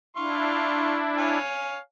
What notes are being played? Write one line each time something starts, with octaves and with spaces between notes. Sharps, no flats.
D4 E4 F5 C6 C#6
C#5 F5 G#5